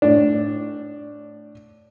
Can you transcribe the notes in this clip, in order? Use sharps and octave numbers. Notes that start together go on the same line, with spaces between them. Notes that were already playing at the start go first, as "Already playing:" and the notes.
A2 D4